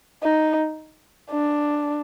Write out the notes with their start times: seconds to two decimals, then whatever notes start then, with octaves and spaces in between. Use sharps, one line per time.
0.23 D#4
1.31 D4